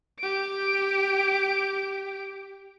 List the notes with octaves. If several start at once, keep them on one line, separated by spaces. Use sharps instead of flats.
G4 D7